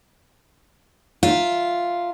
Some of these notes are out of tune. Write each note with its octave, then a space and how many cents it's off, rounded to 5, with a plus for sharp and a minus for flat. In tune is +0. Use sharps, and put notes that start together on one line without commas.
F4 +0 A#4 -5 E5 +5